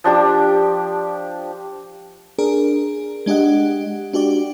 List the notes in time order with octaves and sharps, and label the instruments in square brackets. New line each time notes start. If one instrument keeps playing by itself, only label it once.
[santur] F3 D4 G4 D6
[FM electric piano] D4 G#4 A#4
G#3 D4 G4 D#5 F#5
D4 F#4 G4 D5